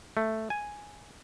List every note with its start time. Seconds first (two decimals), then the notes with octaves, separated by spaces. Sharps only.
0.17 A3
0.50 G#5